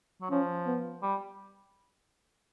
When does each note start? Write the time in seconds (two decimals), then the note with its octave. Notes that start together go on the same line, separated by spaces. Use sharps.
0.21 F#3
0.30 F3 C#4
0.66 B3
1.03 G3